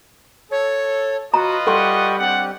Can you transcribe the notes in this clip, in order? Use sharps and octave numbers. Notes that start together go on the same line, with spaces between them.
A4 C#5
F4 F#4 B4 D#5 A#5
G3 A4 F#5 G5 C6 C#6
C4 D4 G4 F#5